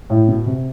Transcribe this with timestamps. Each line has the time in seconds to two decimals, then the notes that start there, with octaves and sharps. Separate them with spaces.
0.10 A2
0.28 B2
0.46 C3